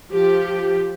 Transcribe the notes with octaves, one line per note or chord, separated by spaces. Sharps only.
F3 G4